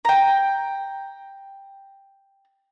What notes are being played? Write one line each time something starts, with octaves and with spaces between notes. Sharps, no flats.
G5 A#5